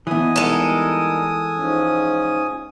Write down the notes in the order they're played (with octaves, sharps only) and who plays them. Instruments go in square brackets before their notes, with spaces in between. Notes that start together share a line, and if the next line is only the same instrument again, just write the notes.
[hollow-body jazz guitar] E3 B3 [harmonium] D4 [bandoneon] G#5 D#6
[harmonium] D#5
[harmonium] G3 D#4 A#4 [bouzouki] G#3 A4
[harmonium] G#2 F3 C#4